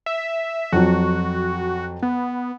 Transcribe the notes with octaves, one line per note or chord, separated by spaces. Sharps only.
E5
F2 F#3 F#4
B3